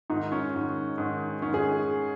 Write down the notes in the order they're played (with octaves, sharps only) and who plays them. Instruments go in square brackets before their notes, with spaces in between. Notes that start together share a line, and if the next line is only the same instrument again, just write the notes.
[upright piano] G#2 D#3 D#4
C#4
G#2 D#3
G#2 D#3
G#2 D#3 C#4
G#4